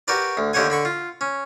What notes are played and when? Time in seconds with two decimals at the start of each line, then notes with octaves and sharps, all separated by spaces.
0.08 F#4 G4 A#4 B4 D5
0.37 D2
0.53 D#2 D3 G4 C#5 F#5 G#5
0.70 D3 B5 C#6
0.85 F4
1.21 C#4